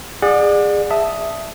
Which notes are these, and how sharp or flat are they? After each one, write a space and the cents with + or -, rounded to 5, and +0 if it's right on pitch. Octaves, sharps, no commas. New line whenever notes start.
G#4 -20 D5 +25 F#5 -30
E5 +0 A5 +0 D#6 +5